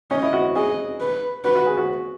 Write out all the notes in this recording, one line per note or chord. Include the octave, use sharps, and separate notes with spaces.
C#4 D#5
E4
F#4
G#4 D#5
B4
F#4 B4
F#4
G#4
F#4